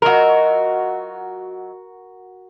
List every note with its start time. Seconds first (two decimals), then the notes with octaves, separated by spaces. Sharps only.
0.02 F#3 F4 F#4 A#4 D#5